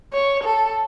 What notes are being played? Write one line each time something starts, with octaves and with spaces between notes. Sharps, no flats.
C#5
A4